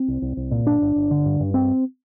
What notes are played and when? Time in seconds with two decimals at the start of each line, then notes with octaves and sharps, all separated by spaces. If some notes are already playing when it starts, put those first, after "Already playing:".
Already playing: C4
0.08 C2
0.22 C2
0.37 C2
0.51 A#2
0.66 G1 D4
0.81 G1
0.96 G1
1.11 D3
1.25 G2
1.40 G2
1.54 C4